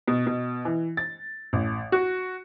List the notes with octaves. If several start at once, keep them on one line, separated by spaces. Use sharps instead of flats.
B2
B2
E3
A6
A1
F#4